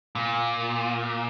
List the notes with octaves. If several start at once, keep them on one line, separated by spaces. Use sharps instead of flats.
A#2